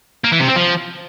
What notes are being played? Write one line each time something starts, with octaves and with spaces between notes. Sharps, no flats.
A#3
E3
C3
C4
F3